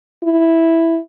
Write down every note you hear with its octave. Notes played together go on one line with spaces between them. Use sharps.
E4